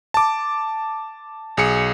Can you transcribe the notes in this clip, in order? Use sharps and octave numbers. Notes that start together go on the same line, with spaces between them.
A5 D6
B1 G#4 C#7